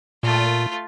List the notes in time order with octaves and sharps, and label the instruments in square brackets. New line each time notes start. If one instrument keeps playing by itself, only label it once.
[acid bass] A#2 [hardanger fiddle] A3 F4